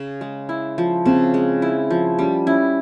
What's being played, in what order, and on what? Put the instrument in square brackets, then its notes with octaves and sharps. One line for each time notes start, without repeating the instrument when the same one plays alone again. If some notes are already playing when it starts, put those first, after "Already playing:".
Already playing: [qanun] C#3
G#3
E4
F3
[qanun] C#3 [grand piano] C4
[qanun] G#3
E4
F3
[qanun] G3 [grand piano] C#4
[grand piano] C#4 [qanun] E4